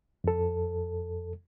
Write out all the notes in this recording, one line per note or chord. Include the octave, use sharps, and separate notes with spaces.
F2 A4